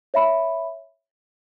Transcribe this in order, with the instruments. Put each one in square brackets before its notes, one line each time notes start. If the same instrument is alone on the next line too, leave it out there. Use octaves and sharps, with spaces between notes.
[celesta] C#5 E5 B5